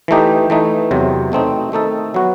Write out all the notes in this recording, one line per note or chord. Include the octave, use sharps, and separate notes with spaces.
E3 A3 D#4 G4
E3 A3 D#4
E2 C3 F#3 C4
B2 A3 C4 D#4
D#3 A3 D#4 A4
F#3 B3 F#4